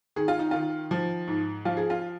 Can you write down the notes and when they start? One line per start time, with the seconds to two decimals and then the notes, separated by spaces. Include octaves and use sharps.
0.16 D#3 G#4
0.28 F4
0.39 D#4
0.51 D#3 F4
0.91 F3
1.28 G#2
1.65 F3 F4
1.77 G#4
1.90 F4